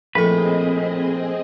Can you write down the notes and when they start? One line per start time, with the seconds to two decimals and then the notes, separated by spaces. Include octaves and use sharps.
0.15 A#1 A2 C4 G#4 B4 D#5 C#6